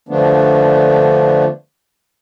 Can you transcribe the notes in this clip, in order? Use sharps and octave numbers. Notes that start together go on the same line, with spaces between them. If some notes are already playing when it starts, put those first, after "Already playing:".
D3 F3 A3 B3 D4